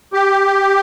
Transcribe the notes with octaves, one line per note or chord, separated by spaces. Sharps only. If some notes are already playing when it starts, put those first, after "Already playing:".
G4